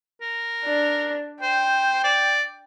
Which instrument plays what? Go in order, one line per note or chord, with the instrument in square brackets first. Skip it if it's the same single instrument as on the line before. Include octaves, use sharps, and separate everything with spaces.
[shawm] A#4
[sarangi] D4
[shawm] C5 [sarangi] G5
[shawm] D5